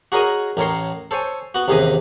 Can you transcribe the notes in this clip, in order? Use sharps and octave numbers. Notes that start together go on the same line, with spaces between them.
F#4 G#4 A#4 C#5 D#5 G#5
A1 A2 A#4 C#5 C6
A4 C5 C#5 G#5
B3 F#4
A1 D#2 C3 G#4 B4 D#5